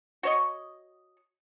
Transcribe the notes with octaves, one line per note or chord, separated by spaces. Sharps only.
F#4 C#5 D#5